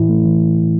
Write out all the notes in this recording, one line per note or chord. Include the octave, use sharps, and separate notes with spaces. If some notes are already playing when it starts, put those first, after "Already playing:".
Already playing: A2 E3 E4
A3
E3